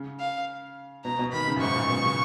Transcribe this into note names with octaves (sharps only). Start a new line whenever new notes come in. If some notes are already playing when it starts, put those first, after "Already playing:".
Already playing: C#3
F5
B2 A#5
B2
D#3 B5
C#3
F#2
G#2 C#6
A#2
B2
C#3